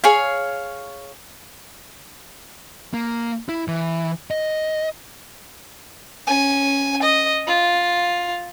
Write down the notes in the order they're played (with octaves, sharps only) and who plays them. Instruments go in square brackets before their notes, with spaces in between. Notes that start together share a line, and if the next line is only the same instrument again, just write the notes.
[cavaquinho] G#4 C#5 F5
[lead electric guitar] A#3
E4
E3
D#5
[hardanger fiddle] C#4 G#5
D#5
F4